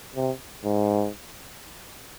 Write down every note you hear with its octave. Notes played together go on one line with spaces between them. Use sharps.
C3
G#2